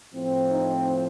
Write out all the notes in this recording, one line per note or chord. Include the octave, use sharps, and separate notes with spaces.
A2 F3 C4
D#4